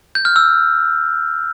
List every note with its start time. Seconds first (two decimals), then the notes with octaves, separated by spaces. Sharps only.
0.15 G6
0.25 F6
0.36 E6